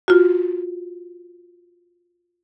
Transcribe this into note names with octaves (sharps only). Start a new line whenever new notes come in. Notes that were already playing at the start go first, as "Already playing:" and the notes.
F4 F#4